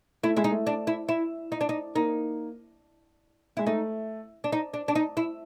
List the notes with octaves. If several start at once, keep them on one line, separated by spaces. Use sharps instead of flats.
A3 E4
G#3 E4
D#4
A3
D4
E4
E4
D#4
D4
D#4
A#3 D#4
G#3 E4
A3 D#4
D4
D#4
D4
D4
D#4
E4